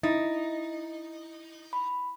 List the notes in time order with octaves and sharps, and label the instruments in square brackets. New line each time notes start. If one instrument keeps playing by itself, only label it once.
[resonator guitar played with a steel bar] D#4 [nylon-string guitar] E4 [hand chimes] A6
[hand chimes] B5